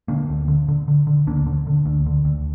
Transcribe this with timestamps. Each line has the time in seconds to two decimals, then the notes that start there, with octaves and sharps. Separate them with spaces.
0.08 D3 A#3 D4
0.29 D2
0.48 D3
0.68 D3
0.88 D3
1.07 D3
1.27 D2 A#3 D4
1.47 D3
1.67 D3
1.86 D2
2.07 D3
2.25 D2